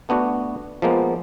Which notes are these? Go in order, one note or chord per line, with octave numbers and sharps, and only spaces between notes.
A3 B3 D4 F#4
F3 G#3 A#3 B3